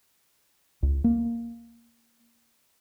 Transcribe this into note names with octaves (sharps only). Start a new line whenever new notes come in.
C#2
A#3